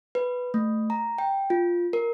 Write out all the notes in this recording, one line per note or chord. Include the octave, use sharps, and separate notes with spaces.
B4
A3
A#5
G5
F4
A#4